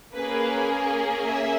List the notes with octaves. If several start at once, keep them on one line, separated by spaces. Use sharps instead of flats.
A#3 C#4 G#4 B4
E5